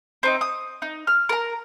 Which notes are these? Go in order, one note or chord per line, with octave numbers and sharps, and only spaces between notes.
C4 D#4 D#5
D#6
D#4
F6
A#4 A#5